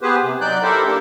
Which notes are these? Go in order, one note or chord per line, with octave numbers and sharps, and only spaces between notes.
B3 G4 G#4 B4 C5
C3
F#3 D#4 D5 F#6 G6
E4 G4 A4 A#4 C5 E5
A#3 D4 G4 A#4